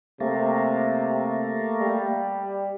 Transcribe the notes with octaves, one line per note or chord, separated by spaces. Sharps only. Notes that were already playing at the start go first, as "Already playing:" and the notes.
C3 A3 A#3
G3